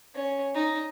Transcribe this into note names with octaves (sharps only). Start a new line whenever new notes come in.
C#4
D#4